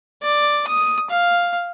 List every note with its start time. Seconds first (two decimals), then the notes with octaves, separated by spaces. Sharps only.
0.23 D5
0.68 D#6
1.10 F5